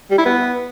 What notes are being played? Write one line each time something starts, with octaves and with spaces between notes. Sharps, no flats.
G3
E4
B3